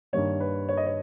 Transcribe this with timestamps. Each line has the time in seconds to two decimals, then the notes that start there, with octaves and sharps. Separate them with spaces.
0.13 G2 D#3 G3 A#3 C#5
0.40 B4
0.69 C#5
0.77 D#5
0.86 C#5